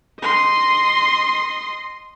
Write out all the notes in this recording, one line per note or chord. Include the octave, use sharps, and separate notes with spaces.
D#5 C6